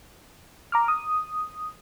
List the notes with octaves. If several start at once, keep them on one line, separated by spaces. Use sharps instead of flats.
A#5 D6 F6
D#6